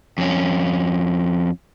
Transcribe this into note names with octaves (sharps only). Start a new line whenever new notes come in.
F2 C#4